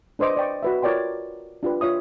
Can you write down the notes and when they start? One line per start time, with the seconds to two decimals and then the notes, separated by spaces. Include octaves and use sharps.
0.19 D4 B4 C5 D#5 D6
0.37 D5 G5 C#6
0.63 F#4 B4 E5
0.82 F4 A#4 C#5 D5 G5 C6
1.63 D4 F4 G4 B4
1.81 F4 C#5 E5 D#6